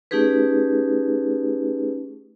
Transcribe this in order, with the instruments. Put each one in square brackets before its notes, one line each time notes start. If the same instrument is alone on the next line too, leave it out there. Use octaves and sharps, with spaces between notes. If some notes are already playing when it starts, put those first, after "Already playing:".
[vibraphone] A3 C#4 D#4 G4 G#4 B4